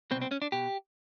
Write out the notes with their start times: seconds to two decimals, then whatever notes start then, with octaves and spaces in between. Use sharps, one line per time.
0.11 B2 C4
0.15 C2
0.22 C4
0.31 C#4
0.42 D4
0.52 B2 G4